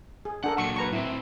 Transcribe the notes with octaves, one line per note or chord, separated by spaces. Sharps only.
G#4
D4 A4 A#4 F#5
A#2 F#3 C#6
B4 A#5 C#6
A2 C4 E4